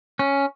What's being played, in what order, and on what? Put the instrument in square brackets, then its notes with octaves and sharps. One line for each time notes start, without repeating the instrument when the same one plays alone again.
[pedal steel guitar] C#4